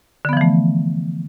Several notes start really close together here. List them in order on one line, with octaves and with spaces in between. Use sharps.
D3 B3 F3 E3 A3